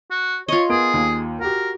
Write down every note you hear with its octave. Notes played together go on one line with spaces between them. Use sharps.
F#4
F4 C#5 D#5
B3 G#4 A#4 D7
D#2
F#4 G4 A#4